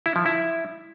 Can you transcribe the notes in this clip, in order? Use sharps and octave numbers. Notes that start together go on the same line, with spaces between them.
E4
F3
E4